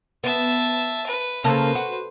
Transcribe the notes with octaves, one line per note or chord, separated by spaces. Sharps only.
B3 E5 A5
B4
C#3 A#3 A4 B4 C5
F#4